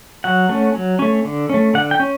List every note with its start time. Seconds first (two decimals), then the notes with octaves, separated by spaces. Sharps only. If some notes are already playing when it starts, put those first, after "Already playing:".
0.24 F#3 F#5
0.49 A3 C#4
0.75 F#3
0.99 A3 C#4
1.25 D3
1.49 A3 C#4
1.74 D3 F#5
1.91 G5
2.00 C#4